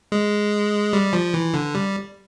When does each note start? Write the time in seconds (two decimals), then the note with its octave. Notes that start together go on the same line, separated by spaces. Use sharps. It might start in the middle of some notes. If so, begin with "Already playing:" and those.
0.12 G#3
0.93 G3
1.13 F3
1.34 E3
1.54 D3
1.75 G3